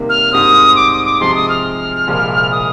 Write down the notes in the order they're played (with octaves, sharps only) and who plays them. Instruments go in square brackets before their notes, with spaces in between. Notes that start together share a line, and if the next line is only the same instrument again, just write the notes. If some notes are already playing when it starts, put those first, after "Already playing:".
Already playing: [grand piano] C3 D#3 G3 A#3
[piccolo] F6
[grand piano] G#2 G3 C4 [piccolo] D#6
[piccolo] D6
D#6
D6
[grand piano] C3 F3 G#3 [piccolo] C6
[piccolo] D#6
F6
[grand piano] C2 A#2 F3 G#3
[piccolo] D#6